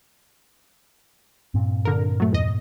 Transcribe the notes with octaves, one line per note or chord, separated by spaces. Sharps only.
G2 A#2 C4
D3 A#4
F#3 A3
E2 D#5